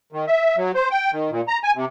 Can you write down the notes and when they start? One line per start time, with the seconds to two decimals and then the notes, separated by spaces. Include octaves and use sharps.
0.12 D#3
0.27 E5
0.57 F#3
0.75 C5
0.91 G5
1.12 D#3
1.30 A#2
1.48 A#5
1.63 G#5
1.75 C3